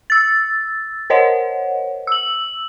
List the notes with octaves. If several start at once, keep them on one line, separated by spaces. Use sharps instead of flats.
E6 A6
A#4 C5 C#5 D#5 F#5
E6 F#7